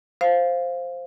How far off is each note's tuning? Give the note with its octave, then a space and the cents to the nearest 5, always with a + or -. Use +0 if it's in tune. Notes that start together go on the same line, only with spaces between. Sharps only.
C5 +0 F5 +0